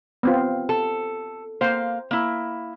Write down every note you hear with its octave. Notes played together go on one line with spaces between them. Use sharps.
B3 C4 F4
A4
A#3 C5 F5
A#3 E4